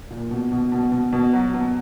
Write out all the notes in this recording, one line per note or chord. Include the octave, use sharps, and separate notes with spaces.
A#2
B2
B2
B2
B2
B2
F#3
B2